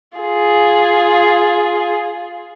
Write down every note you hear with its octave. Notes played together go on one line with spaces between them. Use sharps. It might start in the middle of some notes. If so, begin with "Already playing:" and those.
F4 G#4